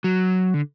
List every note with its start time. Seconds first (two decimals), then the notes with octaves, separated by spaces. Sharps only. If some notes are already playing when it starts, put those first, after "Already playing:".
0.04 F#3
0.54 D3